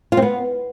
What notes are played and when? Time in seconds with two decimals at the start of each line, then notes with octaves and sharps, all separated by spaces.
0.12 F4
0.17 C4
0.22 B3